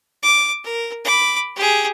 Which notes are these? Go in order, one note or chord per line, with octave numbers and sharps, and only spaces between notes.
D6
A#4
B5 D6
G4 G#4